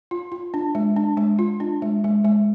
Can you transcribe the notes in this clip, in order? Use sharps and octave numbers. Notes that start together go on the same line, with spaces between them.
F4
F4
D4
G#3
D4
G#3
F4
D4
G#3
G#3
G#3